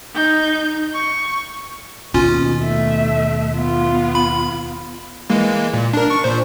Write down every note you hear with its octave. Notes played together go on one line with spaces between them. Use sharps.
D#4 G6
C#6
D#2 B2 C#4 F4
A3 E5
B3 F4
B5
E3 G#3 A#3
A#2
D4 A#4
C#6
A#2 C5